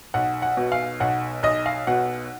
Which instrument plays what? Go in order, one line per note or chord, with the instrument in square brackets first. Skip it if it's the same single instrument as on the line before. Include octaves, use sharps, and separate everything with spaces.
[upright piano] B1 F#5
F#5
B2
F5
B1 F#5
B1 D#5
F5
B2 F#5